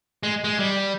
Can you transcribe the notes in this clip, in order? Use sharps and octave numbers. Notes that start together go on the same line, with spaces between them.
G#3
G#3
G3